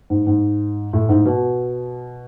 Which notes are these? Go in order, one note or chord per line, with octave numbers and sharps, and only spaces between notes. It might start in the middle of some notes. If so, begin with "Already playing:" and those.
G#2
G#2
A2
G#2
B2